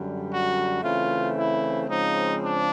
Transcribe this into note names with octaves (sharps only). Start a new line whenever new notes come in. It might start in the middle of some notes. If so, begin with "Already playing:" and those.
Already playing: F#2 D3 G3
F#4
C#3 E3 A3 C4 F4
E4
C#3 F3 G#3 C4 D#4
D4